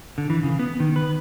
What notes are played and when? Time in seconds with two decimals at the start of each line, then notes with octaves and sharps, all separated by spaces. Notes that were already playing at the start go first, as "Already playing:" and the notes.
0.18 D3
0.30 E3
0.43 C#3
0.59 B3
0.80 D#3
0.96 B4